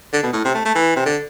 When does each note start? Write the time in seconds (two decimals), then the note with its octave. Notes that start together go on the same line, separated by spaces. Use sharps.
0.13 D3
0.23 B2
0.33 A2
0.45 C3
0.54 A3
0.65 A3
0.75 E3
0.96 C3
1.06 D3